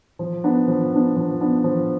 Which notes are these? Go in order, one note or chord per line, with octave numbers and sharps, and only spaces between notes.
F3
B3 D4
F3
B3 D4
F3
B3 D4
F3